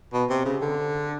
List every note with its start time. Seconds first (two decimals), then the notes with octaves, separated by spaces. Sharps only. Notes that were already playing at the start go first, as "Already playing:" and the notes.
0.13 B2
0.30 C3
0.45 C#3
0.61 D3